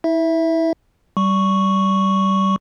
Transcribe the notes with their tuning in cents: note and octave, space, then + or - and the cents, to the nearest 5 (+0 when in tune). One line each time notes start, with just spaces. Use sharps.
E4 -30 E5 +0
G3 -20 C#6 +0